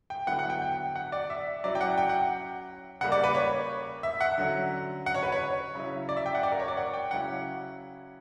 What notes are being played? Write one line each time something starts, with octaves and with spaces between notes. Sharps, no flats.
G5
D3 F#3 B3 E4 F#5
F#5
G5
G5
F#5
D5
E5
F#3 C#4 E4 D5
G5
F#5
G5
F#5
C#3 G3 A#3 F#5
D5
B4
C#5
E5
F#5
D3 F#3 C#4
F#5
C#5
B4
C#5
C#3 F#3 C#4 E4
D5
E5
G5
F#5
D5
A#4
C#5
D5
F#5
G5
C#3 F#3 C#4 E4 F#5